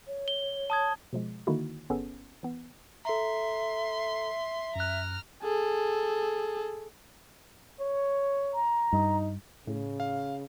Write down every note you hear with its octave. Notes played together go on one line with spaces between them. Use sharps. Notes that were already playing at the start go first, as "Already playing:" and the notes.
C#5
G7
A5 D#6 G#6
B2 F3 G#3
D3 D#3 A#3 D#4 E4 F#4
G1 B3 C#4 G#4 A4
E3 B3
A4 E5 A#5 C6
F#2 A#5 F6 F#6
G#4 A4
C#5
A#5
G2 D#4
A2 C#3
F5